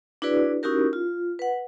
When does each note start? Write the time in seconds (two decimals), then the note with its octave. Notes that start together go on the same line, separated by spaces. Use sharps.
0.22 D4 E4 F#4 G#4 B4 D5
0.63 C#4 D#4 E4 F#4 G4 A#4
0.93 F4
1.39 B4 F#5